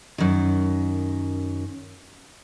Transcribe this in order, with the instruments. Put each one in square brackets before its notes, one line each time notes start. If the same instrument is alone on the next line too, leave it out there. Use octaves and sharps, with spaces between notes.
[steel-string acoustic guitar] F#2 D#3